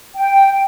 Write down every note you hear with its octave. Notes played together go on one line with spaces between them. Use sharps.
G5